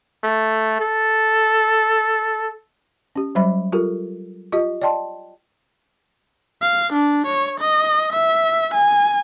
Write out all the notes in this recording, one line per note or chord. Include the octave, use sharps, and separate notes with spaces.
A3
A4
C#4 G4
F#3 G3 C5 E5 B5
F4 G4 A4 A#4
F4 G4 D#5
D5 D#5 G5 A5 C6
F5
D4
C#5
D#5
E5
G#5